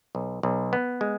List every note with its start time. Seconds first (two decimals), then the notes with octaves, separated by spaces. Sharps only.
0.15 B1
0.43 B1
0.73 B3
1.01 G#3